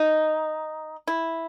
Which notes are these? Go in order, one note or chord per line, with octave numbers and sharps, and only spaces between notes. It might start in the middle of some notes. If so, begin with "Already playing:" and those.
Already playing: D#4
E4